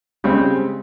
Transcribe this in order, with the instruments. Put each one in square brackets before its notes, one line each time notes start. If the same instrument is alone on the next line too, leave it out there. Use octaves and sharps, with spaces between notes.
[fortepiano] C#3 G3 C4 [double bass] G#3